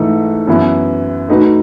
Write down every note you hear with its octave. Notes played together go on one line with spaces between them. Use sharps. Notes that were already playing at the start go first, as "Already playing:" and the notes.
Already playing: G#2 E3 A3 D#4 A4
F#2 E3 B3 E4
A3 D#4 F#4 B4